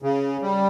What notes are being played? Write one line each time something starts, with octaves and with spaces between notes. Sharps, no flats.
C#3
G3